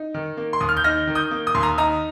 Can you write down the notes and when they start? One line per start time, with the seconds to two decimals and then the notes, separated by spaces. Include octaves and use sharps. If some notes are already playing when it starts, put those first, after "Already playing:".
Already playing: D#4
0.14 D#3
0.37 A#3
0.53 C6
0.61 D#2 D#6
0.69 F6
0.77 G6
0.84 D#4 F6 A#6
1.07 D#3
1.15 D#6 G6
1.31 A#3
1.47 D#6
1.55 D#2 C6
1.63 A#5 D#6
1.78 D#4 A#5 D#6